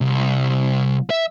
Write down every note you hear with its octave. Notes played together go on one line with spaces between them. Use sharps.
C2
E5